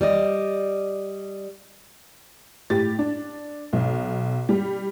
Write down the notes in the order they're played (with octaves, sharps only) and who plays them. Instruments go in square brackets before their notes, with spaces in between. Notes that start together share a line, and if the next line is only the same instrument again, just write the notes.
[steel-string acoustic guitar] G3 D5 D#5
[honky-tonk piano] A2 G4 A6
D4
B1
G3